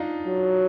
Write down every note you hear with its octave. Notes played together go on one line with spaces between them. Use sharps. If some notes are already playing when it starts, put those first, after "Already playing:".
Already playing: D4 D#4 F4
F#3